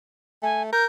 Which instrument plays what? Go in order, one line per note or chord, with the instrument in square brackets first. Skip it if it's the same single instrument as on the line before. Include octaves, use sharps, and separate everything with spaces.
[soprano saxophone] A3 [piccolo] G#5
[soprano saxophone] A#4 [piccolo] G6